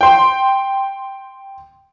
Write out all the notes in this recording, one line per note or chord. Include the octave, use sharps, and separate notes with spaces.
G5 C6